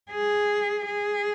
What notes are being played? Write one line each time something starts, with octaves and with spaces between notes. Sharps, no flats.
G#4
G#4